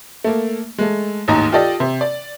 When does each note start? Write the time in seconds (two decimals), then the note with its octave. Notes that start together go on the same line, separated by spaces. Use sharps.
0.24 A3 A#3
0.78 G#3 A3
1.28 A1 D#2 G#2 D#4 A#5
1.52 F4 G4 A4 D5 D#5
1.80 C3
2.01 D5